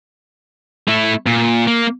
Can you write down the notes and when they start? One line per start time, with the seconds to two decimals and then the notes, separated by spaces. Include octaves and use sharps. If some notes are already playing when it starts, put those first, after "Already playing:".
0.88 A3 E4
1.27 A#2
1.67 A#3